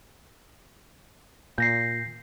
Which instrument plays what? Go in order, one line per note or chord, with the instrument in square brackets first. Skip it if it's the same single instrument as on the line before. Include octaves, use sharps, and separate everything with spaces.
[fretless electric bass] A#2 [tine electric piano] G6 A#6 C7